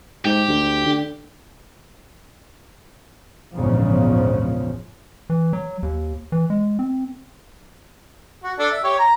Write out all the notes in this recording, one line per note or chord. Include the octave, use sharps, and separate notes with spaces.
G#2 G4
D2
D3
A#1 E2 G#2 C#3 F3
E3
F#3
D#2
E3
G#3
C4
F#4
D4 A4
E5
G4 C#5
A#5